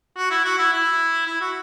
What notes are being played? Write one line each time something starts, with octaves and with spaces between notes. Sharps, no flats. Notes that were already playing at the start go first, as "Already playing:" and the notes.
F#4
E4
F#4
E4
E4
E4
F#4